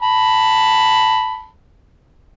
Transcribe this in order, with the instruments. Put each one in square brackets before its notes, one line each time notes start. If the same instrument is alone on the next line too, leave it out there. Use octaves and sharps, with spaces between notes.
[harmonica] A5 B5